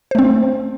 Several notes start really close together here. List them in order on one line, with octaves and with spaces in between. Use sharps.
C5 A3 C4